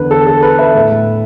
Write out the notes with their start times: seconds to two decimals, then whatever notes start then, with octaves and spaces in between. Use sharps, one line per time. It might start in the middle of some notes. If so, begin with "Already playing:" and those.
Already playing: E2 D3 B3 B4
0.11 A4
0.27 A4
0.43 B4
0.59 B4 E5
0.75 A2 A3